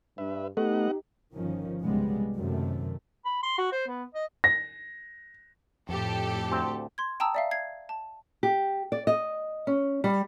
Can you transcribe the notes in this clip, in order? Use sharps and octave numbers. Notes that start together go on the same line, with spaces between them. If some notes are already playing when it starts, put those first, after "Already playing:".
G2 B4 E5
A3 B3 D#4 G4 D#5 F#5
G1 D#3 F3 C#4
C2 C#3 G3 G#3 B3
F#2 C3 D#3 A3
B5
C6
F#4
C5
B3
D#5
A#6
F2 A2 G4 A4
D2 C4
C6 G#6
G5 A5 A#5 D#6 E6
D5 E5 F5
G#6 C7
A5
G4
D5
D#5
C#4
G3